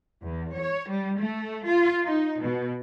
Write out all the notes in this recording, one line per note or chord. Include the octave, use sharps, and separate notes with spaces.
E2
C#5
G3
A3
F4
D#4
B2